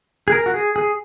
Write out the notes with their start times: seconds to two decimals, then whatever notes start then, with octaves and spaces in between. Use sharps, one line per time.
0.28 G#4
0.32 A#4
0.46 F#4
0.54 G#4
0.76 G#4